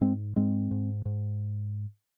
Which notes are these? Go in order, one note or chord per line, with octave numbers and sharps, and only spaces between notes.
G#2 G#3 C4
G#2 G#3 C4
G#2
G#2